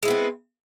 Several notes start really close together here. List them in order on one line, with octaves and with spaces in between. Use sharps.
G#3 E4 B3 C4